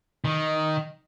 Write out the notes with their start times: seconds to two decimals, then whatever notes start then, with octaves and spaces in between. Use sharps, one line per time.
0.25 D#3